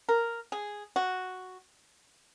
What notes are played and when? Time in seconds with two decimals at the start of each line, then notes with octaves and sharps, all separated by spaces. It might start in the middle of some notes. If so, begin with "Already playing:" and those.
0.09 A#4
0.52 G#4
0.96 F#4